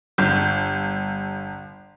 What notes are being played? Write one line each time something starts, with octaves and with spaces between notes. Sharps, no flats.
G1 G6